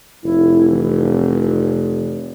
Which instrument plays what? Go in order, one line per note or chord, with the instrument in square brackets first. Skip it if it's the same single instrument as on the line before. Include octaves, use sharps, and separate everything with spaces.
[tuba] F1 [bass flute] E4
[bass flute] E3